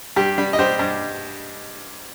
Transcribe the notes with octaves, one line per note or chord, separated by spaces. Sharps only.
G2 G4
G3
D#5
G3 G4 C5
G2